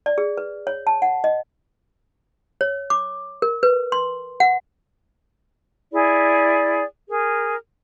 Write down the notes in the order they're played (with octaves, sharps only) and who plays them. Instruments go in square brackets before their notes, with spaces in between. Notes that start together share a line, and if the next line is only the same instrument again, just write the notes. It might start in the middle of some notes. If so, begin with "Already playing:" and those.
[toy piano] D5
G#4
B4
C#5
A5
F#5
D#5
C#5
D6
A#4
B4
C6
F#5
[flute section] E4 G#4 D5
G#4 A#4